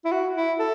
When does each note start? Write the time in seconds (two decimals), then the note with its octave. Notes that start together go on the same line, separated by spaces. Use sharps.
0.05 E4
0.12 F#4
0.36 E4
0.59 A4